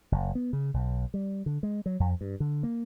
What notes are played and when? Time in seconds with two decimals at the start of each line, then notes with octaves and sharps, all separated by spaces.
0.12 F#1
0.35 B3
0.53 C#3
0.74 B1
1.14 G3
1.46 D3
1.63 G#3
1.86 F#3
2.00 F2
2.21 G2
2.40 D3
2.63 A#3